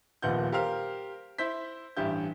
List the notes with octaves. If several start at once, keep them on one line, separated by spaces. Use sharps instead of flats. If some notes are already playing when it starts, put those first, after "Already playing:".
D#1 A#1 A#2 B3 F#5 G6
G4 A#4 C5 F5 F6
E4 C5 G6 B6
A1 G2 G4 E5 G6